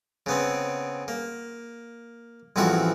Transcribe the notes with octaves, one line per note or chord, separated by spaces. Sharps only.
C#3 B3 C4
A#3
A1 E2 F3 C4 F#4 E5